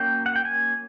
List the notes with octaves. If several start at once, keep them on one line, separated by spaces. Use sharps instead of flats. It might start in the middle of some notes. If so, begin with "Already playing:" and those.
Already playing: F#3 A#3 C#4 G5
F#5
G5
G#5